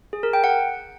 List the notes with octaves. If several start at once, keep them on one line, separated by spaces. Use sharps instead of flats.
G#4
A#4
G5
F#5